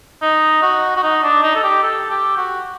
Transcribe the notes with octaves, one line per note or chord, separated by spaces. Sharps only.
D#4
F#4
F#4
D#4
D4
D#4
A4
G4
A4
G4
F#4